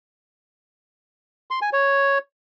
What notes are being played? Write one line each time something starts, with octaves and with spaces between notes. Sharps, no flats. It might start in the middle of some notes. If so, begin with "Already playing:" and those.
C6
G#5
C#5